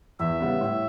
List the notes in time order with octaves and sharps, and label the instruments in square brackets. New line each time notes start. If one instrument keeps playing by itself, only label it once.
[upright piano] E2 [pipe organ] E5
[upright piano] C#3 G3 B3
A2